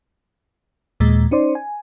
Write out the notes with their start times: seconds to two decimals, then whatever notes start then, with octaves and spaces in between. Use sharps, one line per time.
1.00 D#2 A#2 G#3
1.31 C#4 D#4 C5 D5 C6
1.55 G#5